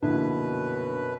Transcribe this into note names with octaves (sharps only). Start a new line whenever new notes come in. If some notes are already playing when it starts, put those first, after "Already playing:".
A#1 F#2 B2 D3 D4 E4 B4